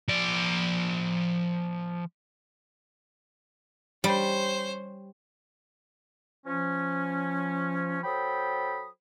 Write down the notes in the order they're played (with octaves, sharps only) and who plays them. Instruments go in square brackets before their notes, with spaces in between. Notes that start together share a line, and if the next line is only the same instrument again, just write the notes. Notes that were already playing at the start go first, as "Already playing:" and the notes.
[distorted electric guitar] F3 D5
[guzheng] G3 [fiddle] C#4 C5
[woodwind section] F3 C#4
F#3 A4 C5 G5 B5 D#6